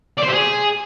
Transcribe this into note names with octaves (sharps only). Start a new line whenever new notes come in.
D5
C5
G4
G#4